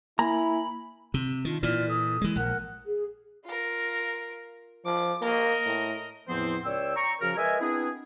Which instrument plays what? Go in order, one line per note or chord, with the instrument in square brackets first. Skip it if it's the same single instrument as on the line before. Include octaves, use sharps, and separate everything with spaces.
[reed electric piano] A#3 G#5 [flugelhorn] E4 [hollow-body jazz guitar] A#5 [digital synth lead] B5
[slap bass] C3
[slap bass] D#3 [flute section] D4 F4
[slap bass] A#2 E3 [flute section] F4 D5 F6
[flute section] A4 D#6
[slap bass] E3 G#3
[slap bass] A#1 [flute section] A#4 F#5 F#6
[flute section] G#4
[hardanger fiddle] F4 A#4
[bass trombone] F3 [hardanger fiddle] D6
[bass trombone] A#3 [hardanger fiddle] A#4 D#5
[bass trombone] A2
[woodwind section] E2 A2 F3 B3 C4 C5
C#2 C#5 D5 G5 E6
G5 A#5 C#6
C#3 F3 F#4 A#4
G#3 A#4 B4 D#5 E5 G#5
B3 C4 D4 E4 G#4